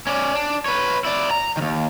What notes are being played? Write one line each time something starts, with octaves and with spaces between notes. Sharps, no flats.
C#4 D5
D4
B4 C#5
E4 D5
A#5
D#2 D#3